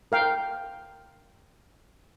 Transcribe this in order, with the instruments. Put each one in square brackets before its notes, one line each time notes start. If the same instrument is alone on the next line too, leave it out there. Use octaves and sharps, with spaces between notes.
[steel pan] A#4 F5 G5